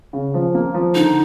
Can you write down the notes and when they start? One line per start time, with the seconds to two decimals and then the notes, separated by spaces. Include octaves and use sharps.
0.13 C#3
0.34 F3
0.55 A#3
0.74 F3
0.95 D3 D#4